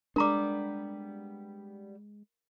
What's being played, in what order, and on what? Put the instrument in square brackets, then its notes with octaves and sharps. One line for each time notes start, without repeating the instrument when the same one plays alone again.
[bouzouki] G3 B3 [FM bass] G#3 [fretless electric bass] D4 [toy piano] A#4 A#5 D6